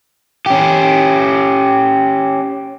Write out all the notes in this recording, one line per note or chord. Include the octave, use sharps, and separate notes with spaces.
C#4 G4